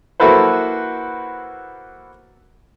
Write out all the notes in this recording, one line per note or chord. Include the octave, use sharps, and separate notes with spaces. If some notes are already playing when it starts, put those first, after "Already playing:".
A#3 E4 F#4 A4 B4 C5